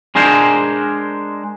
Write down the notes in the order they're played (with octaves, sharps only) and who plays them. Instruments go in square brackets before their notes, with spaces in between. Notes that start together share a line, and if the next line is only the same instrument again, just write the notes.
[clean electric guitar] G#3 D4 G#4 A#4 C5